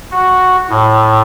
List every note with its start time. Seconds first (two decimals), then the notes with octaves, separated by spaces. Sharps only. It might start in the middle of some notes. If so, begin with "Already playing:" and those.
0.12 F#4
0.70 A2